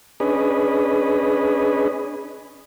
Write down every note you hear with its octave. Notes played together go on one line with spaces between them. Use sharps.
C#4 D4 G#4 B4 D#5